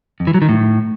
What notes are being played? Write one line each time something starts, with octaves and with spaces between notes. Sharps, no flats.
F2
E3
F#3
D#3
A2